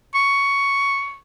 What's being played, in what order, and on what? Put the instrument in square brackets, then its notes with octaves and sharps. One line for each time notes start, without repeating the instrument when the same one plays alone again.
[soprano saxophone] C#6